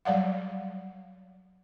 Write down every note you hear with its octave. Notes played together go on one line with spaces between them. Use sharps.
F#3 G3 D5 F5 F#5